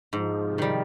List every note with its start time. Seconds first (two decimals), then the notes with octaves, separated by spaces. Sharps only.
0.13 G#2 F3
0.44 C3
0.58 D#3 G3